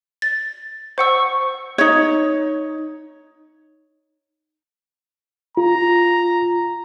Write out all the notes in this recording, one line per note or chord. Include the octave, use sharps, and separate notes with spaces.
A6
C5 F#5 C#6 E6
D#4 C#5
F4 A#5